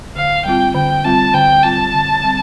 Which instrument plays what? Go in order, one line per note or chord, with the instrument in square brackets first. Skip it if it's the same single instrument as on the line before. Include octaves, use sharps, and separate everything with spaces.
[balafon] D3 [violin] F5
[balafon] G3 C4 F4 [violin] G5
[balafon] D3 [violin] G5
[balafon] G3 C4 F4 [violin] A5
[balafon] D3 [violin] G5
[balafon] G3 C4 F4 [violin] A5
[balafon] D3
G3 C4